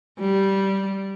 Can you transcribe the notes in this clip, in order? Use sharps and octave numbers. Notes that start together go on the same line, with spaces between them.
G3